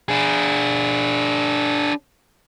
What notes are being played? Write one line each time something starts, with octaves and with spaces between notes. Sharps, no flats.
D4 G#4